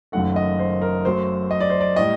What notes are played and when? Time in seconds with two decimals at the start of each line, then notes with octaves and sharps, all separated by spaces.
0.12 F#1 F#2 D#3 A3 F#5
0.36 D#5
0.59 C5
0.82 A#4
1.05 F#2 F#3 A3 C5
1.51 D#5
1.60 D5
1.70 C5
1.81 D5
1.96 A2 G3 D#5